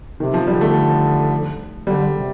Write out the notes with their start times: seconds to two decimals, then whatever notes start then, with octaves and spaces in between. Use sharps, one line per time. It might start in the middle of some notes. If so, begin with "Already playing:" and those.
0.19 C3 D#3
0.34 F3
0.47 D3 G3
0.61 A3
1.87 D3 G3
2.15 C3